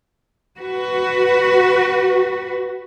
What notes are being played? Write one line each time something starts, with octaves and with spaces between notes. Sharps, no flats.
F#4 B4